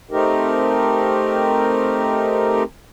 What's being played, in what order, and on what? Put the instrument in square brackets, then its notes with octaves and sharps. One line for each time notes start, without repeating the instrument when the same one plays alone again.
[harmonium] A3 C4 D#4 G4 A#4